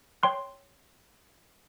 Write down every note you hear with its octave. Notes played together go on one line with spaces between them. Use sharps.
C#5 G5 C6 F#6